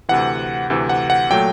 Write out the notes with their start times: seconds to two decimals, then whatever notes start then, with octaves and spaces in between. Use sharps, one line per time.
0.09 D2 C3 E3 F#5
0.70 D2 C3 E3
0.89 F#5
1.10 F#5
1.30 A#2 F#3 A3 G5